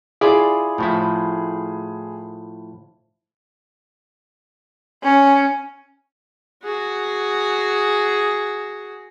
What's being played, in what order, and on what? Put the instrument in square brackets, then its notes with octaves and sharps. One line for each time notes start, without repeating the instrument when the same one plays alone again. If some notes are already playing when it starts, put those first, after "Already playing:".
[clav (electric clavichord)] E4 F4 D5 [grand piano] G#4
[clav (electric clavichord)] A2 F3 E4
[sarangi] C#4
[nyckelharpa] F#4 G#4